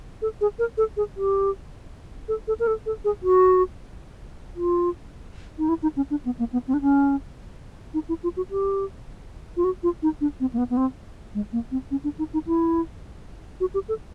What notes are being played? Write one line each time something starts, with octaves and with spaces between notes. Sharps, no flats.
A4
G#4
A#4
A4
G#4
G4
A4
A4
A#4
A4
A4
G#4
F#4
F4
D#4
E4
D#4
C#4
D4
B3
A#3
B3
C4
D4
C#4
D#4
E4
F4
F#4
G4
F4
F#4
F4
D#4
D4
C4
A#3
B3
B3
C4
G#3
A#3
C4
C#4
D4
D#4
D#4
E4
F#4
G4
A4